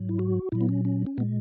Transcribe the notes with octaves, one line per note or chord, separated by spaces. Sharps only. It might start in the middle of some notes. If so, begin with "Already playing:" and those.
Already playing: G#2 F#3
E4
F#4
A#2 F#3 E4
B3
C#4
C#4
C#4
A#2 G#3 B3